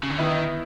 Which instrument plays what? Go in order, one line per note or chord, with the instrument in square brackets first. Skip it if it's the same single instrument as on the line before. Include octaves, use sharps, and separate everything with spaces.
[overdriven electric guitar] C#3
D3
[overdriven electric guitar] D#3 [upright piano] B3 E4